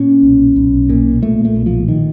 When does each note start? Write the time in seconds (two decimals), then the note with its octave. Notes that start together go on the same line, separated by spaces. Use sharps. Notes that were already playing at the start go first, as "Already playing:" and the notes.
Already playing: A#2 C#4
0.23 B1
0.56 B1
0.90 A#2
1.22 A#2 A3
1.45 A3
1.56 B1
1.66 F3
1.88 D#3